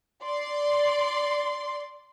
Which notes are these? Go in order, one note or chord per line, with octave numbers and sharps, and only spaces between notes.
D5 C6